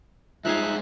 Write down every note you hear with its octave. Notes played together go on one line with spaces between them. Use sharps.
G2 F3 G#3 D#4 E5 F5 G#5 F#6